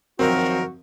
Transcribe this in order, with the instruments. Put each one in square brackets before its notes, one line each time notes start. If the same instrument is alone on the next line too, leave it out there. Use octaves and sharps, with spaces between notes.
[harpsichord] F#2 D#3 F3 [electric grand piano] C4 [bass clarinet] F#4 [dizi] A#4